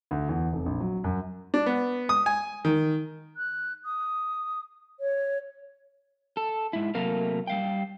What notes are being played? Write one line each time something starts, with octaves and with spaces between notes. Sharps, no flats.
D2
E2
F1
A#1
F#3
F#2
D4
B3
D#6
G#5
D#3
F#6
D#6
C#5
A4
G#2 E4
C3 F#3 A3 A#3 A#4 F5
G3 F5 G5